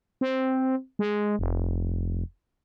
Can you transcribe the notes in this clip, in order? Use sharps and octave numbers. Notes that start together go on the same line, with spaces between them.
C4
G#3
F1